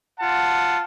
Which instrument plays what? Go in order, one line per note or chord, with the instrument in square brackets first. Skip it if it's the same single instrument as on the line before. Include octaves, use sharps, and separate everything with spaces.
[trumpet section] F4 F#5 A5